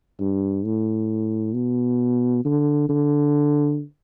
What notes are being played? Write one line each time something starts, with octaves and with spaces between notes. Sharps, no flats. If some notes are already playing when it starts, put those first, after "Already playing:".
G2
A2
B2
D3
D3